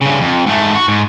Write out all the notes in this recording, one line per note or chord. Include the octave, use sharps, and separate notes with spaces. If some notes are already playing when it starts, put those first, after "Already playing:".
G2 C#3
F2
G#2 A3
F#4
G#2